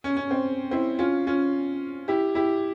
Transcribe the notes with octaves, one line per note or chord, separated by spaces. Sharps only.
C#4
C#4
C4
C4 E4
C#4 F4
C#4 F4
E4 G4
E4 G4